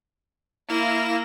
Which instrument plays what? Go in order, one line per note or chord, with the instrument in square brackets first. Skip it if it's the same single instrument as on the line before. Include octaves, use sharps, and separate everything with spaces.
[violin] A#3 A#6 [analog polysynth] E4 F5 E7